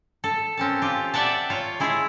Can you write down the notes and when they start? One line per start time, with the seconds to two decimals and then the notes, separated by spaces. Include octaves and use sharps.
0.24 A4
0.57 C4 C#4 A5
0.82 F4 G4
1.14 D5 E5 F#5 G5 A5
1.50 F4 C#5 F5
1.80 G#3 E4 G#4